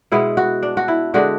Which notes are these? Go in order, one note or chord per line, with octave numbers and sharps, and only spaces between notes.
B2 G#3 B3 E4
F#4
D4
F#4
E4
D3 G#3 D4 F#4